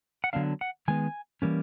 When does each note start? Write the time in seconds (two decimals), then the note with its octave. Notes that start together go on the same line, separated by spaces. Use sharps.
0.24 F#5
0.33 D3 F#3 B3 D4 F5
0.61 F#5
0.88 D#3 G#3 B3 G#5
1.42 E3 G3 A#3 C#4